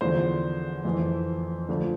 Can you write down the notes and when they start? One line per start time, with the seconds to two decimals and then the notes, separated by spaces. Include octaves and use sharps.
0.01 E2 D3 F3 C5
0.85 F2 E3
1.69 D2 D3 F3